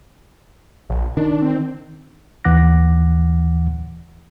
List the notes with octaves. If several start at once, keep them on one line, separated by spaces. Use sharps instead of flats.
A#1
D#3 D4
C4
D#2 E3 F#5 D6 F#6 A#6